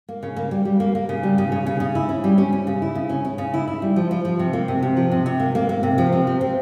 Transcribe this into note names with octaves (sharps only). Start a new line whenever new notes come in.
A#3
C#3
A#3
G3
G3
A#3
A#3
C#3
G3
C#3
C#3
C#3
C#3
E4
C#4
G3
C#4
C#4
C#3
E4
C#3
C#4
C#4
C#3
E4
E4
G3
F3
F3
F3
C3
A#3
C3
C3
F3
C3
C3
A#3
A#3
A#3
C3
F3
C3
C4
C4